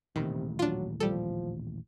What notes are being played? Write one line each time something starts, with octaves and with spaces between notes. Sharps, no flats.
D#1 A1 C3 D#3
F#3 D4 F4
F3 G3 A4